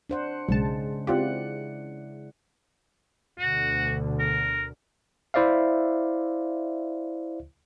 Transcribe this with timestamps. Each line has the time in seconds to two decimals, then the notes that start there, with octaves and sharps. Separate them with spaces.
0.10 D4 C5 F#5
0.49 B1 G#2 C#3 G#3 A5
1.07 C4 E4 F4 G4 D5 F#5
3.38 D2 B2 D3 F#4
4.19 A#4
5.34 E4 C5 D5 E5 F5